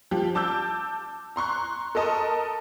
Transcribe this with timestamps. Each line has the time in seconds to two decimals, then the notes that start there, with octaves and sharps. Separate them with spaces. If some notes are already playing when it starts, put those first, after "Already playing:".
0.11 F3 G4
0.35 A5 D6 E6 G6
1.36 A#5 C6 C#6 F#6
1.95 A4 A#4 D#5 A5 D#6